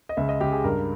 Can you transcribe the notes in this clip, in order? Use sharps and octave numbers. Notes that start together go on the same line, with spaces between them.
D#5
C#2 E5
D#5
C#2 G4
G#4
G2 A#4